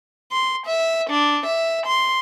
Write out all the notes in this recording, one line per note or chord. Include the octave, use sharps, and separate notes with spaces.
C6
E5
D4
E5
C6